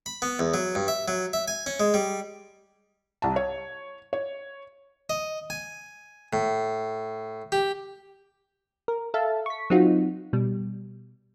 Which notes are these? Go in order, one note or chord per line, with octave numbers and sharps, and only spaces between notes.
B5
B3
E2
F#3
G2
E5
F#3
E5
G#5
C#4
G#3
G3
C2 A5
C#5
C#5
D#5
G#5
A2
G4
A#4
A4 E5 F5 A5
C#6 B6
F#3 C4 D#4 F4 F#4
B2 G3